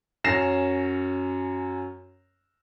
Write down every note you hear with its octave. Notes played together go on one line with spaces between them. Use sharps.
F#2 C#4 A#6 C7 E7